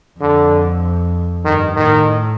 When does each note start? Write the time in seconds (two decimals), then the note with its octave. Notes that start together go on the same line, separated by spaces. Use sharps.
0.20 F2 D3
1.45 G2 D#3
1.75 A2 D#3